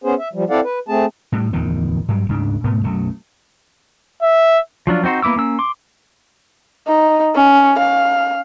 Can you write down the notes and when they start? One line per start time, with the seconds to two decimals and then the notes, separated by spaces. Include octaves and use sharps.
0.04 B3 C#4 G#4 C5
0.19 E5
0.33 F3 G3
0.50 C4 E4 A4 D5 F5 F#5
0.63 B4
0.88 A3 C4 G#4 A5
1.32 A2 G3
1.53 D1 E2 D#3 F3
2.08 G2 F#3 G3
2.29 D1 G#2 C#3 D4
2.64 G#2 B2 A3 B3
2.84 B1 F#2 F#3 A3
4.22 E5
4.87 F3 F#3 D4 F4
5.04 C4 D#4 F#4 C5
5.22 A#3 B3 E4 D6 E6
5.36 A#3 C#4 E6
5.59 C6 D6
6.88 D#4
7.36 C#4
7.79 F5